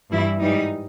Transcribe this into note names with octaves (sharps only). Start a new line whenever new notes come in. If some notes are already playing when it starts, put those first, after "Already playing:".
G2 E3 G3 E4
G#2 E3 G3 D#4